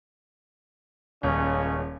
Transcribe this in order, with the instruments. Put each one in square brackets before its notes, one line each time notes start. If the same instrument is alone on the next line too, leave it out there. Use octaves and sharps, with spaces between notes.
[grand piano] D#1 [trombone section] C#2 C#3 C#4